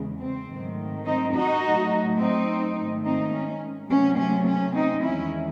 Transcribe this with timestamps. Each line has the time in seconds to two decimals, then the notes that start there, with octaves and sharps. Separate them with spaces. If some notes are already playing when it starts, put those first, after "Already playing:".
Already playing: E2 C#3 G#3
0.20 C4
0.48 G#2 D#3 F#3 A3
1.05 C4 D#4
1.34 D#4 F#4
1.62 A2 F#3 A3
2.19 C4 D#4
2.75 G#2 D#3 A3
3.05 C4 D#4
3.33 C#4
3.89 C3 F#3 A3 C#4
4.18 C#4
4.47 C#4
4.74 C4 D#4
5.03 E2 D#3 G#3 C#4 E4